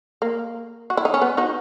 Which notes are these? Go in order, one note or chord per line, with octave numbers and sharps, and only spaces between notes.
A#3
F#4
E4
D#4
C#4
B3
D#4 F#4